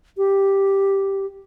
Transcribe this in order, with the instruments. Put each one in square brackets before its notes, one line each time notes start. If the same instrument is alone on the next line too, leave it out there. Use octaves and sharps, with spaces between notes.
[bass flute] G4